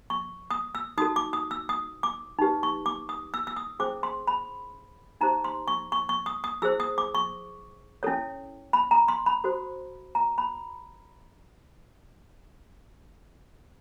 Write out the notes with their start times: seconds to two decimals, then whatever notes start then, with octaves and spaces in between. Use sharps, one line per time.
0.10 C#6
0.51 D#6
0.75 E6
0.98 D#4 F#4 A4 D#6
1.16 D6
1.33 D#6
1.51 E6
1.69 D#6
2.03 D6
2.39 D#4 G4 B4
2.63 C#6
2.86 D6
3.09 D#6
3.34 E6
3.47 E6
3.56 D#6
3.79 C#4 E4 G#4 C5 D6
4.03 C6
4.27 B5
5.21 D#4 G4 C5 A#5
5.44 C6
5.68 C#6
5.92 C#6
6.09 C#6
6.26 D#6
6.44 D#6
6.62 E4 G#4 C5 E6
6.80 D#6
6.98 D6
7.15 C#6
8.03 C#4 E4 A4 C#5
8.73 B5
8.91 A#5
9.08 C6
9.26 B5
9.44 F#4 A4 C5
10.15 A#5
10.38 B5